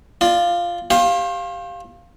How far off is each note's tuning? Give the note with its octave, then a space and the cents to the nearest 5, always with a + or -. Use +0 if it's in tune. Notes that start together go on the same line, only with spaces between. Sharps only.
F4 -5 D5 +30
G4 +0 C5 +45 F5 +0